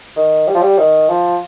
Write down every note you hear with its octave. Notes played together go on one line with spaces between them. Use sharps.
D#3
G3
F3
G3
D#3
F3